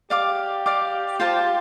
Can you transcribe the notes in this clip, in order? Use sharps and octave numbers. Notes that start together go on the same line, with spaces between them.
G4 D5 F5 D6
D5 F5 D6
F4 C5 F5 A5